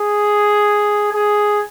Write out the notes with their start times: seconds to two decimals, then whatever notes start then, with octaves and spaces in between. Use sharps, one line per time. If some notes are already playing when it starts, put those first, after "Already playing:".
Already playing: G#4
1.13 G#4